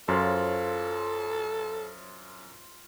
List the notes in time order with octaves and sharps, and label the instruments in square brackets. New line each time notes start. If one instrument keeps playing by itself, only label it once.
[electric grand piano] F#2 [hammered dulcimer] F4 C5 C#5 [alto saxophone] A4